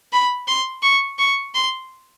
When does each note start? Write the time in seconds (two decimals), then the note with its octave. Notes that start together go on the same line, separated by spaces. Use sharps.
0.12 B5
0.47 C6
0.83 C#6
1.19 C#6
1.55 C6